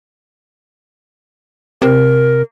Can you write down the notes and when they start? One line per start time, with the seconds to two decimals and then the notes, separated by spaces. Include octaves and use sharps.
1.82 C3 A#4